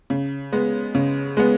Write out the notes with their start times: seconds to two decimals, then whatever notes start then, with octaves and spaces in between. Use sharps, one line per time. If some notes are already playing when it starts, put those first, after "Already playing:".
0.10 C#3
0.52 G#3 B3
0.95 C#3
1.37 G#3 B3